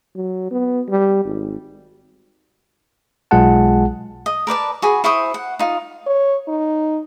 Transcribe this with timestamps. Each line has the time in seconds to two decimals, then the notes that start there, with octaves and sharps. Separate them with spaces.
0.16 F#3
0.51 B3
0.89 G3
1.25 G#1
3.31 B1 G#3 F4 G#4 F#5 A5
4.26 D#5
4.47 A#4 B4 D5 A5
4.82 F#4 G#4 B5
5.04 E4 C5 C#6 D#6
5.34 F#5
5.59 D#4 F4
6.06 C#5
6.48 D#4